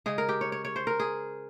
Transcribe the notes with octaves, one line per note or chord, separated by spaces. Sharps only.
C#3 G#3 G#4
A#4
G4
C#5
C#5
C#5
C5
A#4
G#4